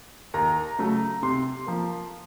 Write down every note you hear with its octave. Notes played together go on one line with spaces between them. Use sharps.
D#2 A#5
C#3 F#3 A3
C3 C6
F3 A#3